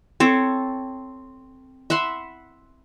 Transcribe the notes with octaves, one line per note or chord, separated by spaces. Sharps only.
C4 A4 C#5
E5 F#5 B5 C6